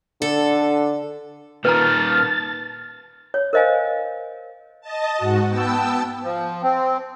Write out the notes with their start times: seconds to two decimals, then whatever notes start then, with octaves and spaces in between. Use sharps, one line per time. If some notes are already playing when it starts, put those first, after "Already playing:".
0.22 D3 A4
1.65 A#2 D#3 B4 A5 A#5 F6 A6
3.34 C#5
3.53 A#4 C5 D#5 F5 G#5
4.81 D#5 A5
5.17 G#2 F#4
5.48 B3 G5 A5 E6
6.23 F3
6.62 C4